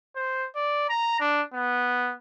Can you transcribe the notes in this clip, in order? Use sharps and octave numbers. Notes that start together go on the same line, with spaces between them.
C5
D5
A#5
D4
B3